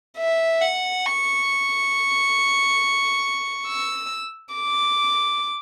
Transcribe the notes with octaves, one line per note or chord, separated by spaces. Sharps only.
E5
F#5
C#6
E6
D6